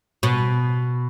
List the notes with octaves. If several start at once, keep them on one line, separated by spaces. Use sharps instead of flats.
B2